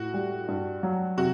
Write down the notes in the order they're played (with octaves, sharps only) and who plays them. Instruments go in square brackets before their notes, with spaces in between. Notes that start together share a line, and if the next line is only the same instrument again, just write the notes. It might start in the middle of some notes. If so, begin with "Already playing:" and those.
Already playing: [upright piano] A2 [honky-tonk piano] F#4
[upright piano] G3
G2
F#3
[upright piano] C3 [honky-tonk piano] F#4